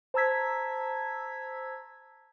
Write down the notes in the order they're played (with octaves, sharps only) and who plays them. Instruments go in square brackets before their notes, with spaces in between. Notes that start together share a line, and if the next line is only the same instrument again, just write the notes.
[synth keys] C5 A5 A#5 E6 G#6 B6